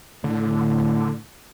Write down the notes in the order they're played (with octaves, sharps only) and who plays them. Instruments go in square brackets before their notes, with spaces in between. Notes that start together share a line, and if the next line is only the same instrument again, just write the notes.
[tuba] A2 [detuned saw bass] D3